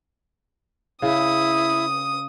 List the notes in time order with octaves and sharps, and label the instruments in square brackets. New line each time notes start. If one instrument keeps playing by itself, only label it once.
[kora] C#3 [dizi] E4 [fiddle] D#6